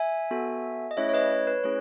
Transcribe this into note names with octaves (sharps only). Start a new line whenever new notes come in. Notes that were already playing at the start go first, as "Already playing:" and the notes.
Already playing: E5 G#5
B3 F#4 A4
D#5
A3 C#4 E4 G#4 C#5 E5
C#5
B4 D#5
C#5
B4
A3 C#4 E4 G#4 C#5